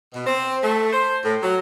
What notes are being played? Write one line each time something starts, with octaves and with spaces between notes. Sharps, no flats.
B2
C4
A3
C5
A2
F#3